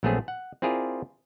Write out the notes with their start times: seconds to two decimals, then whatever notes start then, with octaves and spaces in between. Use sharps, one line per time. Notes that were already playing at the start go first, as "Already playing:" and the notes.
0.03 A#1 F#3 A3 B3 C4 G#4
0.28 F#5
0.62 C4 E4 F4 G#4 A#4 D5